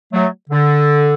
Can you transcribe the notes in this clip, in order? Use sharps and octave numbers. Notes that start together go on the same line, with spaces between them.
F#3 A3
D3